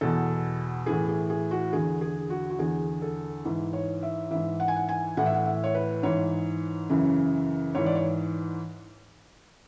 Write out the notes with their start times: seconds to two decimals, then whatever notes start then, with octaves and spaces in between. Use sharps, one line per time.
0.01 E2 B2 A4
0.86 A2 E3 G#4
1.08 G#4
1.30 G#4
1.51 F#4
1.73 E2 D3 G#4
2.01 G#4
2.30 F#4
2.50 F#4
2.59 E2 D3 G#4
3.02 A4
3.45 G#2 E3
3.73 C#5
4.03 E5
4.31 G#2 E3 E5
4.60 F#5
4.68 G#5
4.76 F#5
4.89 G#5
5.17 A2 E3 F#5
5.26 E5
5.34 F#5
5.45 E5
5.64 C#5
5.75 B4
6.03 G#2 E3 C#5
6.90 F#2 C#3 E3
7.75 G#2 E3 C#5
7.86 D5
7.95 C#5